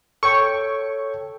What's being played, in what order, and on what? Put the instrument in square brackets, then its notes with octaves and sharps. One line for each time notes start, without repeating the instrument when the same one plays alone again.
[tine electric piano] A4 C#5 G5 [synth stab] C#6